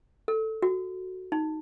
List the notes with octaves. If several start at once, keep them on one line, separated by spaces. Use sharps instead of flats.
A4
F#4
D#4